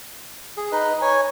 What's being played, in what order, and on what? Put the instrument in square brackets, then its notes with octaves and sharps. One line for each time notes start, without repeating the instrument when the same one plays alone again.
[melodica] G#4
D#4 B4 D#5
C#5 G#5